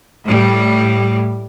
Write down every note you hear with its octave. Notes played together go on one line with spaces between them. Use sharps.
A2 G3